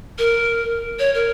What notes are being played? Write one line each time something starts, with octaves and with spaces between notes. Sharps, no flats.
A#4
C#5
A#4